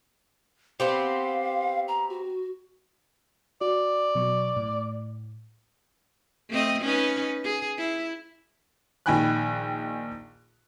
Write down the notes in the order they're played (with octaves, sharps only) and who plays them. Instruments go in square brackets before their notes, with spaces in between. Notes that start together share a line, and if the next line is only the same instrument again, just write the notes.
[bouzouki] B3 C4 G4 [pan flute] F5
[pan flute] A#5
F#4
[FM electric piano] F#4 [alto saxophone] D5
[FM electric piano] B2 F#3 C#6
A2
[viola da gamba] A3 C4 D#5
C#4 D#4 B4
G#4
E4
[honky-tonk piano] A#1 D#3 G5 G#5 B5 F#6